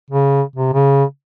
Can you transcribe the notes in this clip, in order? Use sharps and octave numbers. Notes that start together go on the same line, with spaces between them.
C#3
C3
C#3